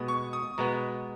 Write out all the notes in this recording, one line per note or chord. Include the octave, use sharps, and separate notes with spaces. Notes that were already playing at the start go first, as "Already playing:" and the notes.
Already playing: B2 G#3 B3 D#6
C#6
D#6
B2 G#3 B3 A#5